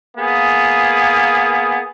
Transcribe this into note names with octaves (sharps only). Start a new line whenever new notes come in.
A#3 B3 G#4